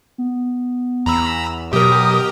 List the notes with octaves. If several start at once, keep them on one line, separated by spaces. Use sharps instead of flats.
B3
E2 A#5 B5 E6
B2 F#3 G4 A#4 D#6